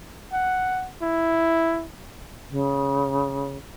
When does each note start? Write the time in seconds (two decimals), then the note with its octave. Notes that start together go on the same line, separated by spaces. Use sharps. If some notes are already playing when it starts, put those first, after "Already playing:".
0.33 F#5
1.02 E4
2.50 C#3